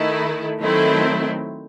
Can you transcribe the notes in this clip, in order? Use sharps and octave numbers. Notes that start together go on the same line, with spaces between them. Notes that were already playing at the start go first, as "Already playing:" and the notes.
Already playing: D#3 A3 E4
D#3 F#3 A3 C4 E4